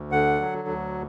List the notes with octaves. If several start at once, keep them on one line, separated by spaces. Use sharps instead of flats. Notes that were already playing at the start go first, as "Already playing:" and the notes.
Already playing: D2
D3 F#5
F#3
D2